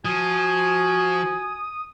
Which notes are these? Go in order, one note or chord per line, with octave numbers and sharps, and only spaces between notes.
F3 F#4 G#5 D#6